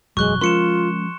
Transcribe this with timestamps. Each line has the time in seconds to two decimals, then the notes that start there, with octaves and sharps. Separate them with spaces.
0.17 E1 F#2 F#3 G#3 C#6 F#6 G7
0.41 F3 G#3 C#4 F4 A#4 C6 C#7 E7